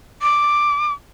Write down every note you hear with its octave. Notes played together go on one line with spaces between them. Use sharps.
D6